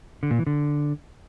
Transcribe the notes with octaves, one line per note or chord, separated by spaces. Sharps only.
D3
A#2
E3
D3